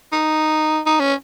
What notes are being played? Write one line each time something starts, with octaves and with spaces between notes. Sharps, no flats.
D#4
D#4
C#4